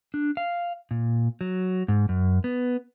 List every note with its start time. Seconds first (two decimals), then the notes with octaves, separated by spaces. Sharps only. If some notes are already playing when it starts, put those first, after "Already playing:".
0.14 D4
0.37 F5
0.91 A#2
1.41 F#3
1.88 G#2
2.09 F#2
2.44 B3